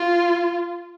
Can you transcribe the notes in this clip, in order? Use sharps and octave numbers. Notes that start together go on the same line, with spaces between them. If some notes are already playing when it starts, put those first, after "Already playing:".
Already playing: F4